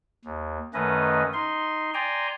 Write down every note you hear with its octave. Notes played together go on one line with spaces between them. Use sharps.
D#2
F#2 D#3 A3 C#4 B4 D#5
D#4 C6
D5 G5 G#5 A#5 C6